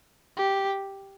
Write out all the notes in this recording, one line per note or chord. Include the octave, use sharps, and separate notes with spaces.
G4